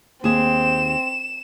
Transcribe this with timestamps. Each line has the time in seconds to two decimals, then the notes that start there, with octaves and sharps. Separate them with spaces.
0.24 D#2 C4 G#4 E7